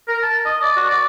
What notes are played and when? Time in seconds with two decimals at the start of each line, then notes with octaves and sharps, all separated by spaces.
0.08 A#4
0.23 A5
0.45 D#5
0.61 D5
0.76 F#4
0.90 D5